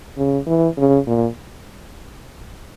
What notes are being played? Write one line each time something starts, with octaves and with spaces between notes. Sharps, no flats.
C#3
E3
C#3
A#2